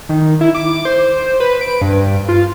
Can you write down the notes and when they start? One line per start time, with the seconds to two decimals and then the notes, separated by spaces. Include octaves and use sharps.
0.09 D#3
0.41 E4
0.55 D6
0.85 C5
1.40 B4
1.61 D7
1.82 G2
2.29 F4